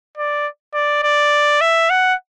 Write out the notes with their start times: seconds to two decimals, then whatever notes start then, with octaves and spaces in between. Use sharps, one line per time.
0.17 D5
0.74 D5
1.03 D5
1.61 E5
1.90 F#5